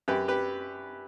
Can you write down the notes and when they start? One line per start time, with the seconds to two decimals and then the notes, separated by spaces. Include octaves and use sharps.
0.08 F#2 G4 B4
0.28 G4 B4